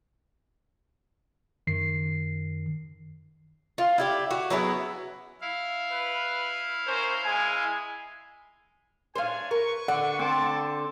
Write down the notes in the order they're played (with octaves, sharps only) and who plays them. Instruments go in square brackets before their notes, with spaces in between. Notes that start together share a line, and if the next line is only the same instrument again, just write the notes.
[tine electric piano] F#2 D#3 C7
[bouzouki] F4
E4 G4 D5
F#4
F#3 B3 E4 G#4
[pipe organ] E4 F5
[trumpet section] B4
C#4 A#4 C5
G#3 G#5
[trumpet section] D4 C#5 G#5 [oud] C5 F5
[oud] A#4 [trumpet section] B4 C#6
[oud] D3 [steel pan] F#5
[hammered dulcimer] C4 [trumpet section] A4 A5 D6